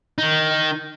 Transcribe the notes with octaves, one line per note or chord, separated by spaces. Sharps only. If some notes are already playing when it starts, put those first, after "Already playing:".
D#3 D#4